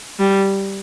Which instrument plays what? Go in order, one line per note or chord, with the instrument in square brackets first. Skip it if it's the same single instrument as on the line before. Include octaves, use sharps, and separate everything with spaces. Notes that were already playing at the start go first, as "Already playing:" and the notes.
[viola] G3